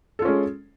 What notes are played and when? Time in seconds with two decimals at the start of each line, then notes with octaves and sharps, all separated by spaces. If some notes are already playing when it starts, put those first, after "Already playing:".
0.19 A4
0.22 F4
0.25 C#4
0.28 G#3